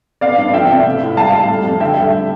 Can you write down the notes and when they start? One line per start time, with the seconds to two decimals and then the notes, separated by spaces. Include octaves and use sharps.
0.21 B3 D5 F5
0.38 G2
0.54 F3 E5 G5
0.70 C3
0.86 A3
1.02 A2
1.17 G3 F5 A5
1.33 G3
1.49 A3
1.64 F2
1.80 D3 E5 G5
1.97 G3